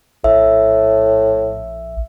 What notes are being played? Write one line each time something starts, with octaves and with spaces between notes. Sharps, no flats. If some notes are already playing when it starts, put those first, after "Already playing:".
A#1 A2 E5